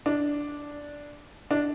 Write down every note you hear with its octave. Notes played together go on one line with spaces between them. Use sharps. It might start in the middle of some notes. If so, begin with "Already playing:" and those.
D4
D4